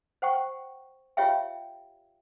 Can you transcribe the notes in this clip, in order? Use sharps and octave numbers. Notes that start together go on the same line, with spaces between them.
C5 F#5 G5 C#6
F4 G4 C#5 E5 F5 G5